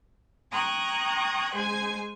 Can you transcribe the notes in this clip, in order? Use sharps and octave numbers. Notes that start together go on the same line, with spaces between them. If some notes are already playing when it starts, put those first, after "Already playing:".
G5 A#5 C#6 D#6 F#6 G#6
G#3 G#4 C5 G#5 G#6